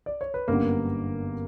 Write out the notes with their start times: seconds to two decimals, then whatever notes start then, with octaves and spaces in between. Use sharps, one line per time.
0.06 D5
0.21 C#5
0.34 B4
0.48 G1 F#2 D3 G3 A#3 B3 A#4